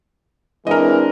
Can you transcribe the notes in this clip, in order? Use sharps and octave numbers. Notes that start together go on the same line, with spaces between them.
E3 G#3 C4 D4 A#4 D#5